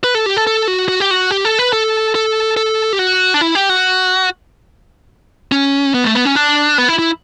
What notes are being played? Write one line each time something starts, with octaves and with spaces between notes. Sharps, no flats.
B4
A4
G4
A4
A4
F#4
F#4
G4
F#4
G4
A4
B4
A4
A4
A4
G4
F#4
D4
E4
G4
F#4
C#4
B3
A3
B3
C#4
D4
B3
E4
E4